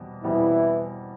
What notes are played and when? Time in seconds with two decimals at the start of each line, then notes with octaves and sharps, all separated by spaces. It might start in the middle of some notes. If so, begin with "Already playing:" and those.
Already playing: E2 B2 G3 C4
0.24 E2 B2 E3 G3 C4 E4